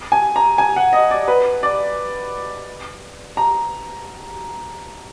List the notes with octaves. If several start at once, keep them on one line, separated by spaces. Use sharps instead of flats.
G#5
A#5
G#5
F#5
D#5
D5
B4
D5
A#5